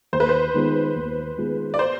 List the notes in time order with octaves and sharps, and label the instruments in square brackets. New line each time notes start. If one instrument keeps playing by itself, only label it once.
[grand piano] D#2 [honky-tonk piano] C5
[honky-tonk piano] B4
C5
[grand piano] D#3 G#3 B3 F4
D#2
D#3 G#3 B3 F4
[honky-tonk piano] D5
C5